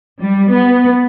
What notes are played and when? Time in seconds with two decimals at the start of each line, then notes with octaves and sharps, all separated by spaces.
0.20 G3
0.51 B3